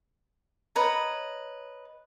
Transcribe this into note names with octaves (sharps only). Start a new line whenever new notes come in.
B4 C#5 D#5 A#5